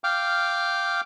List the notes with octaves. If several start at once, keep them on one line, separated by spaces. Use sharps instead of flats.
F5 G5 D6 F6